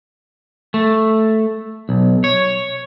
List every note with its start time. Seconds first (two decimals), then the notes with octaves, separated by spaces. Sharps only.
0.74 A3
1.89 B1
2.24 C#5